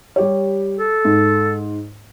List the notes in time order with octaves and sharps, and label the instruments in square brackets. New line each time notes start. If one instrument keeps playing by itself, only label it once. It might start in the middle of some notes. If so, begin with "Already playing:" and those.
[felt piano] G3 G4 C#5
[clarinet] A4
[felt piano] G#2